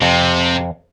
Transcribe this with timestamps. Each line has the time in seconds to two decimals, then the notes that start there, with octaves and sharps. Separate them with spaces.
0.02 F2 C3